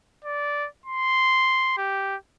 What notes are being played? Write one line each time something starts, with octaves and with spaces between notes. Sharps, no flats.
D5
C6
G4